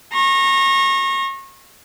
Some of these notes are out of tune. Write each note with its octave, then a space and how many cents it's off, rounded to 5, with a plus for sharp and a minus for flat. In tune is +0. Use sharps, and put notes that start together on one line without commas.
A#5 -10 C#6 -35